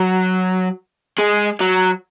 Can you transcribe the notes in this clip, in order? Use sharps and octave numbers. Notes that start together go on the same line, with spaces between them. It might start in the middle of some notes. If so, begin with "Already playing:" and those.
Already playing: F#3
G#3
F#3